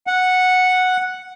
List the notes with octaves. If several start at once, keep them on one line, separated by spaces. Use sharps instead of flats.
F#5